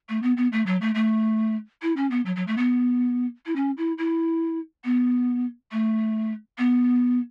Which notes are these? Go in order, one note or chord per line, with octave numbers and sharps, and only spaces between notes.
A3
B3
B3
A3
F#3
A3
A3
E4
C#4
B3
F#3
F#3
A3
B3
E4
C#4
E4
E4
B3
A3
B3